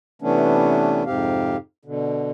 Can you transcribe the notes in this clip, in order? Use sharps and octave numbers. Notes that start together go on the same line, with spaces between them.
C3 E3 A3 B3 C#4 D4
F2 G#2 C3 C4 G4 F5
B2 D3